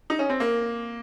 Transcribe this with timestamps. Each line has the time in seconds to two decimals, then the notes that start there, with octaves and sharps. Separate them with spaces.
0.10 D#4
0.19 C#4
0.30 C4
0.40 A#3